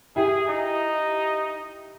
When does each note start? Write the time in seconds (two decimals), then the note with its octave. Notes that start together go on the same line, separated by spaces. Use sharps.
0.16 E4 G4 G#4
0.47 D#4